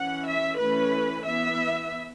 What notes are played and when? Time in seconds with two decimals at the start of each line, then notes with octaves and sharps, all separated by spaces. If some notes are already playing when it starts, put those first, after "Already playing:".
Already playing: E3 C#4 F#5
0.26 E5
0.59 E3 A3 C#4 B4
1.25 E3 B3 E5